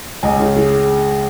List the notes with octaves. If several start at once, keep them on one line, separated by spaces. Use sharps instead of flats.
C#2 D#5 G#5
C#3
G#3